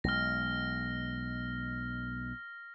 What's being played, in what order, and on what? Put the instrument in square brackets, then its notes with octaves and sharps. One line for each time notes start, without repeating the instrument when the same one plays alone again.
[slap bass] B1 G#3 [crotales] F6 A#6